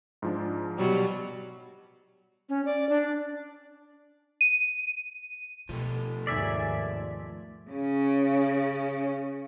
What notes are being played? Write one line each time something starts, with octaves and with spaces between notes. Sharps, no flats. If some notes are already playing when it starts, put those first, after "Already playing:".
G#2 F3 D4
B2 F#3 G3
C#4
D5
D4
D#7
B2 F3 A3
D#2 G#2 D5 E5 G#5
C#3 C#4